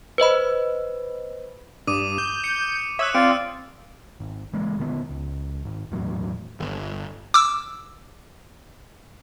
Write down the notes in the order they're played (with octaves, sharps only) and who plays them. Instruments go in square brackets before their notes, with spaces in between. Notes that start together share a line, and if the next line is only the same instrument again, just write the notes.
[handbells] B4 C5 D#5 B5
[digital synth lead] G2 [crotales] D6 D#6 D#7
[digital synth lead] G6
[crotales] C#7
[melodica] C#5 [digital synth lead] E5 [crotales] D#6 E6 F#6
[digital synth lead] C4 [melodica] F4 D5 F5 [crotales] D7
[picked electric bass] G#1
E3 G#3 A#3
D#1 D3 B3
C#2
G#1
E1 E2 A2 F#3
G1
[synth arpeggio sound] D6 E6